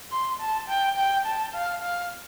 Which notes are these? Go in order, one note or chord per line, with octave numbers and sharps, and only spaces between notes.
C6
A5
G5
G5
A5
F5
F5